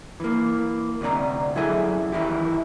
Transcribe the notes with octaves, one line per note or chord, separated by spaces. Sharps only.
E3 A#3
D2 C3 D#4 D5 A#5
F#2 E4 G#4 A4 E5 G#5
D#3 E3 D#4 E4 G4